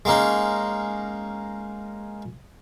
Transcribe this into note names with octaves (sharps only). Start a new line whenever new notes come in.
G#3 A#3 C#4 D#4